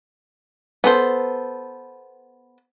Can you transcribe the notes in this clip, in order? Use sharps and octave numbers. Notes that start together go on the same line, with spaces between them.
B3 A4 C5